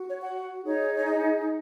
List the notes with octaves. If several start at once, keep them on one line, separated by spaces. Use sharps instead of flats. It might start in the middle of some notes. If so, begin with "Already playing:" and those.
Already playing: F#4
C#5
F#5
D#4 G#4 C#5
C#5
D#5